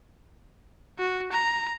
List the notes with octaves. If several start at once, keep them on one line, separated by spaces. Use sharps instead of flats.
F#4
A#5